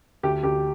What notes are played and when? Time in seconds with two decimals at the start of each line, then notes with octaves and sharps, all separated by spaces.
0.23 D2 G4
0.43 D2 G4